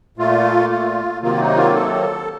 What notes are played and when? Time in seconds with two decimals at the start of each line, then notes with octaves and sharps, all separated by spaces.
0.17 A#2 A3 F4
0.70 F4
1.22 C3 D#3 F#3 A#3 F4
1.40 D#4
1.56 F4
1.74 A4